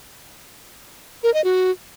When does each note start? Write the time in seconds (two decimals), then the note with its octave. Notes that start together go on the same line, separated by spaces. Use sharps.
1.23 A#4
1.34 D#5
1.44 F#4